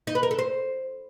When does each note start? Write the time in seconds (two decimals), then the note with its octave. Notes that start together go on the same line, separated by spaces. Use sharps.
0.07 D#4
0.15 B4
0.23 A#4
0.31 A4
0.39 C5